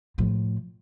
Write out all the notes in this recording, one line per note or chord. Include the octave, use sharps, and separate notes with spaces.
A2 F3